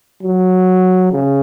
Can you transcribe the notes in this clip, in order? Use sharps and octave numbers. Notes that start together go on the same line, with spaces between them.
F#3
C#3